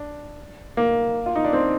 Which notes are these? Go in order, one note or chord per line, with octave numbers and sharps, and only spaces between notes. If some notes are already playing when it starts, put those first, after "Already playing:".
Already playing: D4
A#3
F4
D#4
D4
C4